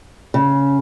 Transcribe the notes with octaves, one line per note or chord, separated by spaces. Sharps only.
C#3